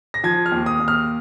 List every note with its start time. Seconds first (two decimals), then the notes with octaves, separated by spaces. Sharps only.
0.14 A#6
0.24 F3 G#6
0.46 F6
0.52 D#2
0.66 D#6
0.80 D#2
0.88 F6